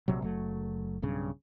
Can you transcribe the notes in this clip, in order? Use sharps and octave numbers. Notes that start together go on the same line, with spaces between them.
A#1 C3 F#3
F#1 F#3 A3
B1 G2 C#3